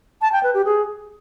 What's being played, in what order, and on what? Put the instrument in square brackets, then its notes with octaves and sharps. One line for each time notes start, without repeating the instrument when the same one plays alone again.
[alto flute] A5
G5
B4
G4
G#4